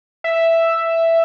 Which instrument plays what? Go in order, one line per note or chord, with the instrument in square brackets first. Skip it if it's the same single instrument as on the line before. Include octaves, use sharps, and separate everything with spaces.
[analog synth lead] E5